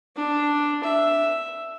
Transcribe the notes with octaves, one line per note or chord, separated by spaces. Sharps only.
D4
E5